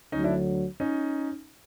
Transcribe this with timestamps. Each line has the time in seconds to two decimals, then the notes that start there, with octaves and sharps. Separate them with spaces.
0.12 D2 D3 F#3 C#4 D#4
0.24 D4 E4
0.80 C#4 D#4